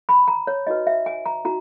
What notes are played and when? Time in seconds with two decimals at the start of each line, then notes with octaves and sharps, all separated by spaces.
0.09 B5
0.28 A#5
0.47 C#5
0.67 D#4 F#4 B4 D#5
0.87 E5
1.06 G#5
1.26 A#5
1.45 D#4 F#4 A#5